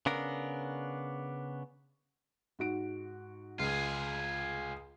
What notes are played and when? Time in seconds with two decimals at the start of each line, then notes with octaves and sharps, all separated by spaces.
0.06 C#3 B3 D4 A#4
2.59 G#2 F#4 D7
3.60 C#2 F4 G#4